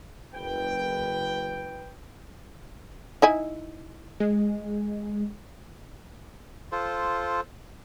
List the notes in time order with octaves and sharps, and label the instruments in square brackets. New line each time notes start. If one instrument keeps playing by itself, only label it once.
[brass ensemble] F#1 B4 G5
[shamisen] D#4 E4 G#5
[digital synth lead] G#3
[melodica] F4 A4 C5